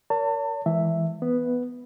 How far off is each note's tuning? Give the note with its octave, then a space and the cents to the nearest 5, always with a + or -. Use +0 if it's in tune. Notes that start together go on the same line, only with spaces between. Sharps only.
A#4 +0 C#5 +40 A5 +35
E3 +0 G#3 +0 E5 +0
B3 +0 B4 +0